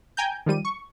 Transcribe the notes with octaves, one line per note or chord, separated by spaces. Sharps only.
G5 G#5 A#5 G6
D#3 F3 G3 D#7
C#6